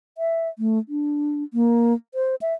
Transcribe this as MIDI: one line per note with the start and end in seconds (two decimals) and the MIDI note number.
0.18 0.49 76
0.59 0.78 57
0.89 1.44 62
1.54 1.94 58
2.14 2.35 72
2.41 2.54 76